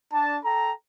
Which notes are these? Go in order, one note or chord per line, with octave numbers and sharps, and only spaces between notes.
D4 A5
A4 G5 A#5